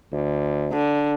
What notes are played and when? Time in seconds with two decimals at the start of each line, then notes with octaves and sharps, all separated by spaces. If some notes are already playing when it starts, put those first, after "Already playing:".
0.12 D2
0.73 D3